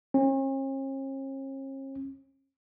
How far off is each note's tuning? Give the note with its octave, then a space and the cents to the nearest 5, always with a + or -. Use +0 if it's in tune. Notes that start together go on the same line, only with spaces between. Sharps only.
C#4 -45